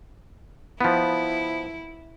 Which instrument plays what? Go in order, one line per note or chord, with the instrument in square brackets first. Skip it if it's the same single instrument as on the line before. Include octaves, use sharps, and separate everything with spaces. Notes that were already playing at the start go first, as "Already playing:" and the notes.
[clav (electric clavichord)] F3 B3 [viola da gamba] E4